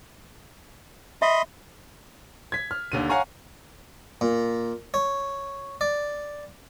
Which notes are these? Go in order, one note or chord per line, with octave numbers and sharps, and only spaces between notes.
D#5 E5 B5 C6
G#6 B6
F6
D#2 D3 D#7
C#5 F5 F#5 G#5 A#5 C#6
A#2
C#5
D5